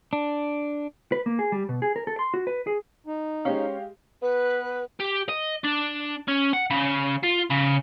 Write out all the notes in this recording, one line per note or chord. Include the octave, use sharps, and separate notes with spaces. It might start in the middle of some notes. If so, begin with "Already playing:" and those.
D4
B4
A#3
G#4
G3
B2
G#4
A#4
A4
C6
F#4
B4
G#4
D#4
G#3 C#4 G4 C5 C#5 F5
B3 B4
G4
D#5
D4
C#4
F#5
C#3
F4
C#3